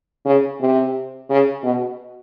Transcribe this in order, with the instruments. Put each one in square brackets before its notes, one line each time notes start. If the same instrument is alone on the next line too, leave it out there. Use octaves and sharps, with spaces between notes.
[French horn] C#3
C3
C#3
B2